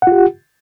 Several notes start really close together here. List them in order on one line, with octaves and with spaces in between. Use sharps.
F#5 F4 G4